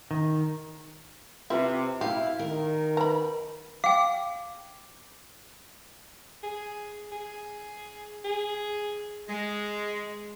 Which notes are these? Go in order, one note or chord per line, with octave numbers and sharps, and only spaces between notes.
D#3
C3 C4 E4 F4 B4 C6
E4 F#4 G4 F5
D#3 A#4
B4 A#5 B5
F5 G5 D6
G#4
G#4
G#4
G#3